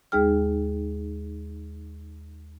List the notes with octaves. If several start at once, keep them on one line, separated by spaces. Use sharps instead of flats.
D#2 G#3 D#4 G#4 G5 F6